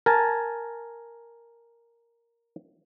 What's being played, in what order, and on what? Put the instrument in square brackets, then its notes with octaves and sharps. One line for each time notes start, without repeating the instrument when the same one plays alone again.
[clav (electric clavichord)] A#4 G#5 A5